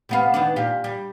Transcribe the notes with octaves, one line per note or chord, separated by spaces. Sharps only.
C3 B3 F5
D#3 B3 D4
A#2 G4 F5
G3